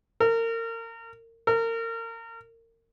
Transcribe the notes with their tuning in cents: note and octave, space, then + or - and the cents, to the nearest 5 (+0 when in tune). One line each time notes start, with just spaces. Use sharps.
A#4 -30
A#4 -30